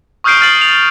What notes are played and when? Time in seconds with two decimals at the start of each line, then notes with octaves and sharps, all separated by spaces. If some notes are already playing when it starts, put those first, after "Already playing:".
0.24 C#6 D#6 F6 G6 C7 D7
0.41 F6 A6 C7 F#7
0.61 F7